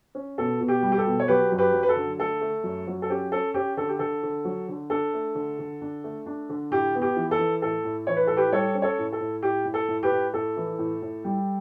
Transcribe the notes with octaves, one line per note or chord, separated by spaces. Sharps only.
C#4
B2 A4
B2
G4
G3
G4
A4
B2
C#5
F#3 G4 B4
F#2
G4 B4
F#3
B4
A4
D3
A3 A4
A3
F#2
F#3
A4
C#4 G4
C#4 A4
C#4 G4
D3 A4
G4
D3 A4
D3
F#3
D3
D4 A4
A3
D3
D3
D4
A3
D4
D3
A2 G4
B3
G4
E3
A4
E3
A2 A4
A2
E3 C#5
B4
A2 A4
G4 B4
G3 A4 C#5
C#4
A4 C#5
A2
A4
A2
A2 G4
A2
A4
A2
G4 B4
A2
A2 A4
E3
A2
A2
G3